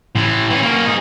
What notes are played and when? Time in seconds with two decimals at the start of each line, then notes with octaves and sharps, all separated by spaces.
0.15 A2 E3
0.50 E3 C#4
0.62 A#3 C#4
0.85 D#4 G#4